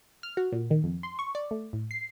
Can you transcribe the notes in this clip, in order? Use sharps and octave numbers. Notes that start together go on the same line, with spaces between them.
F6
F#4
A#2
D#3
F2
C6
C#6
D5
A3
A2
C7